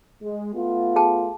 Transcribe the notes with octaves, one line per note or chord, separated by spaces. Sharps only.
G#3
A3 B3 F4
G#4 G5 A5